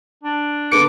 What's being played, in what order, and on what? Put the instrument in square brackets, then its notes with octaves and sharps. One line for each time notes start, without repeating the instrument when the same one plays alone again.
[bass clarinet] D4
[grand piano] D3 B3 C#7 [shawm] D6